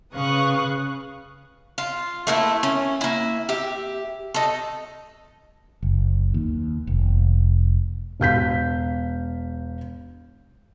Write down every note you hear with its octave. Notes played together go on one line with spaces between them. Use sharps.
C#3 B4 F5 C#6 D#6 F#6
F4
A3 A#3 E4
C#4
A#3 E4
G4 E5
D#4 A4
F#1
D#2
F1
E1 F5 G6 B6